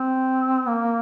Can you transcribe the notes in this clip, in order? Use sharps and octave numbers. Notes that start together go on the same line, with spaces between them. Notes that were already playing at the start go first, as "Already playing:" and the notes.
Already playing: C4
A#3